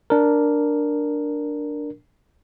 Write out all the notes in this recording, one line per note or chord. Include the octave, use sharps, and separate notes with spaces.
D4 A#4